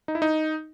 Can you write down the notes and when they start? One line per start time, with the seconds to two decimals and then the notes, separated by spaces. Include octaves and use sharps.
0.08 D#4
0.15 E4
0.22 D#4